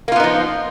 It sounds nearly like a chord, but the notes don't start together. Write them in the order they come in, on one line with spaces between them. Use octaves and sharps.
A#3 F4 B3 D#4 F3